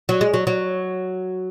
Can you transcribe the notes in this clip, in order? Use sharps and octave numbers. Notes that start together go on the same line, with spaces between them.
F#3
G#3
F#3
F#3